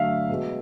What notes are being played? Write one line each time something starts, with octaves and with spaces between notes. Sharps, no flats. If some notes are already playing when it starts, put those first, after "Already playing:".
Already playing: D3 F#3 A3 E5 F5
B2 G#3